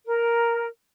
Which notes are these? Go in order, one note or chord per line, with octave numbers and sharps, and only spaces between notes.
A#4